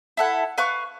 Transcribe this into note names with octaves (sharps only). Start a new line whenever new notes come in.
E4 A4 F#5
B4 F5 C#6 F#6